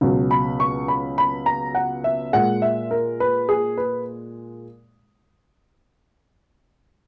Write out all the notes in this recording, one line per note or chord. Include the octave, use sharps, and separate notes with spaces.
C#2 B2 F#3
B5
C#6
B5
B5
A#5
F#5
E5
A#2 G#3 F#5
E5
A#4
B4
G#4
B4